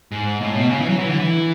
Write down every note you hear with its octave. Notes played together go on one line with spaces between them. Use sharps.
G#2
A2
B2
C#3
E3
F#3
E3
D3
E3